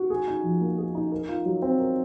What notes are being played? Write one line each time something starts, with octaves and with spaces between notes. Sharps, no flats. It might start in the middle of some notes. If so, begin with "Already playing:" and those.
Already playing: F#4
G#4
D#4
F3
A#3
G#4
D#4
A#4
F4
F#3
C4
A#4